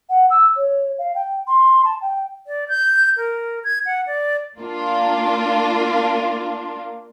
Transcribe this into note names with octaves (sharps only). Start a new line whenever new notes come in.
F#5
E6
C#5
F5
G5
C6
A5
G5
D5
G6
A#4
G#6
F#5
D5
A#3 D4 F4